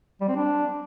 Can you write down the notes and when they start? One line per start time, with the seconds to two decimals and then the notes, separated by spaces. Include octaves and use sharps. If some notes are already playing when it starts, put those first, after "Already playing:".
0.21 G3
0.28 C4
0.36 D4